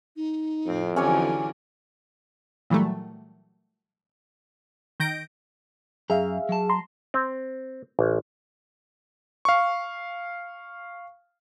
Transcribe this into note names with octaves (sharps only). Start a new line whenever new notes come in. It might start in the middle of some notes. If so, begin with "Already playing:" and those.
D#4
F2 A2 C4
D3 E3 F#3 C#4 G4 C#5 G#5
A#2 E3 F#3 G3 A3
D#3 G6 A#6 D7
F#2 G#4 E5 F5 A#5
F#3 A5
A#5 C6
C4
A1
F5 C#6